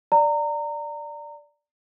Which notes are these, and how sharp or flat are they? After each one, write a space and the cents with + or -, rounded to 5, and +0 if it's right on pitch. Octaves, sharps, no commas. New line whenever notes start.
D5 +0 A#5 -25